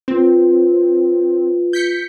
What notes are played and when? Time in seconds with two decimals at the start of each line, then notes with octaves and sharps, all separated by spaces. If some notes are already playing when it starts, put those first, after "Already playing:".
0.08 C4 F4 B4
1.73 G6 B6 C#7